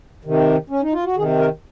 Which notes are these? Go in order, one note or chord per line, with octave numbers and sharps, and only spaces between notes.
C3 D#3
C#4
D#4
F4
F#4
C3 D#3 G#4
A#4